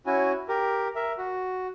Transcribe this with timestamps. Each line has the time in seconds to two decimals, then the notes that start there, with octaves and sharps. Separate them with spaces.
0.06 C#4 E4 F#4 G#5
0.49 G4 A#4
0.96 A#4 E5
1.18 F#4